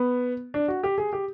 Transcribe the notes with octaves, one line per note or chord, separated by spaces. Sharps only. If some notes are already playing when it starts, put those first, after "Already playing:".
Already playing: B3
D4
F#4
G4
G#4
G4